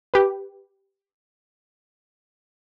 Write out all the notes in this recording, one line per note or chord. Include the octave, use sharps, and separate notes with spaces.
G4 B4